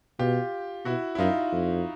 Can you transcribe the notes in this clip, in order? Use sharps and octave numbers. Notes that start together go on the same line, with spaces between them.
B2 F4 G4
B2 E4 F#4
E4
F#2 D#4 F4
F2